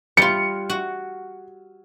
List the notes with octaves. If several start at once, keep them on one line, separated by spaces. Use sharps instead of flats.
G3 F4 C#7
F#4